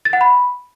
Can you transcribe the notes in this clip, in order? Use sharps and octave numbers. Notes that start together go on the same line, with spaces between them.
A6
F#5
B5